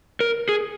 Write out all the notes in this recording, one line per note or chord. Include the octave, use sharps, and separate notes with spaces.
A#4
G#4